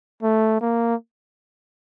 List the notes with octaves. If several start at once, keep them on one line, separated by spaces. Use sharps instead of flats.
A3
A#3